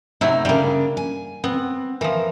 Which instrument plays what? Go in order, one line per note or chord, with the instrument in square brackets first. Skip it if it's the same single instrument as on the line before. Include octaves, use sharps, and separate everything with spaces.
[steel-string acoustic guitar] A2 D#4 [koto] C3 F#3 E4
[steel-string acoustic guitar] C#3 D4 [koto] G3 A#3
[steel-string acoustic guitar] G#5
[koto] B3 [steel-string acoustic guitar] C4
[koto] E3 F3 [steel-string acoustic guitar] A#4